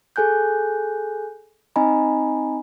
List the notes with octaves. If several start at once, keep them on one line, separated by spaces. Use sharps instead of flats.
G#4 A4 G#5 F#6 G6
C4 D#4 D#5 G#5 A#5 B5